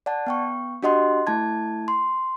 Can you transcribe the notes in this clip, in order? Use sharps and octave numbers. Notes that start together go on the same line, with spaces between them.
D5 F#5 A5
B3 G5 C#6
D4 F#4 G4 D#5 F#5 C6
A3 E4 A5 G#6
C6